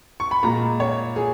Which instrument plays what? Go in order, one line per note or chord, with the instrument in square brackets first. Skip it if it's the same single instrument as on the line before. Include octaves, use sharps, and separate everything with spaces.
[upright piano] C#6
B5
A#2 G#3 A#5
C#5
G#4